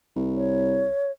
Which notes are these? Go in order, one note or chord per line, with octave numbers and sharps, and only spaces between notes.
C2
C#5